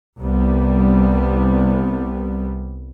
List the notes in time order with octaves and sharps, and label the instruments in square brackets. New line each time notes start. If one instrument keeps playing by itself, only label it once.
[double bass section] C2 G3 B3